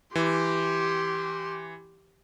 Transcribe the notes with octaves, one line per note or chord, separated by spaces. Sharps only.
E3 G4 C6